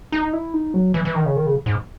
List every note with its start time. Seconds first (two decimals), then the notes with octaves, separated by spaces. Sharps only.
0.12 D#4
0.33 E4
0.54 D#4
0.74 F#3
0.94 E3
1.05 E3
1.15 D#3
1.26 C#3
1.36 D#3
1.46 C#3
1.66 G#2